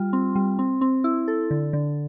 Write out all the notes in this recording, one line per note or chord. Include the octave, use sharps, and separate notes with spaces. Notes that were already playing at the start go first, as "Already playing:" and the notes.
Already playing: G3 F4
C4
G3
C4
C4
E4
A4
D3
D3